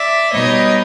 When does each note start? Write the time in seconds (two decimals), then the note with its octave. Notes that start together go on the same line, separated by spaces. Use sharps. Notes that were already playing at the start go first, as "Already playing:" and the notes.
Already playing: D5 E5
0.32 B2 G3 B3 D#4 C#5 D#5